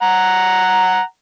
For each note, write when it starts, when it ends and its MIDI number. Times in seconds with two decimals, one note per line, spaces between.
0.02 1.01 78
0.02 1.01 82